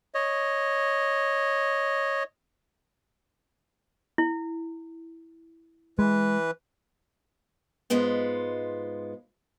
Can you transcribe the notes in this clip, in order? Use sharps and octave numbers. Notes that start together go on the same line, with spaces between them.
C#5 D#5
E4
E3 G#3 B4
G#2 G#3 B3 F4